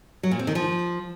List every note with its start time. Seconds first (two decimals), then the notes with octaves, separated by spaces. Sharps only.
0.23 F#3
0.31 A#2
0.39 C4
0.47 D#3
0.55 F3